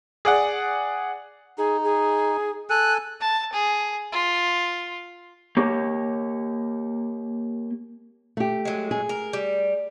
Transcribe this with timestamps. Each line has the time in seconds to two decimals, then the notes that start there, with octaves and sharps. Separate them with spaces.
0.25 G#4 D5 F#5
1.58 D#4 G#4
1.84 G#4
2.70 A4 G#5 F#6
3.21 A5
3.53 G#4
4.12 F4
5.57 A#3 G4 C#5
8.37 A3 G4
8.65 F#3 G#3
8.91 G#4
9.09 A#4
9.33 G3